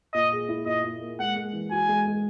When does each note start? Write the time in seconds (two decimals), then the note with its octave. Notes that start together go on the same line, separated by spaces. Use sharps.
0.13 A#2 D#5
0.32 G#4
0.49 E4
0.66 A#2 D#5
0.84 A#2
1.01 A#3
1.19 G#3 F#5
1.36 G#3
1.53 E3
1.71 F#4 G#5
1.88 G#3
2.07 G#3